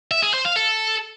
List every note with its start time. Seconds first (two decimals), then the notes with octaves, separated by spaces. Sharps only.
0.11 E5
0.22 G#4
0.34 C5
0.45 F5
0.56 A4